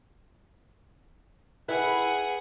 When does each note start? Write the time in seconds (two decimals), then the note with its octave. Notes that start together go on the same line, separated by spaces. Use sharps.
1.68 E4 G#4 B4 F#5